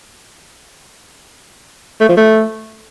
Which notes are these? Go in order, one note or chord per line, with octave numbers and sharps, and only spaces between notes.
A3
F3
A3